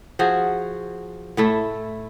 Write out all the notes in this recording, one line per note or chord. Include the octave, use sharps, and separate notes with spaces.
F3 F#4 G#4
A2 A3 E4